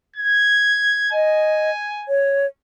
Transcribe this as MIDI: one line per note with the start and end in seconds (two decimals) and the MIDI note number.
0.16 1.10 92
1.12 1.70 75
1.12 2.05 80
2.08 2.46 73